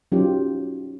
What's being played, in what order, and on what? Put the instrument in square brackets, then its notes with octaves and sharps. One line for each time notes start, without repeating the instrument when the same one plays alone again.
[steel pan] F#3 C#4 D#4 F4 G4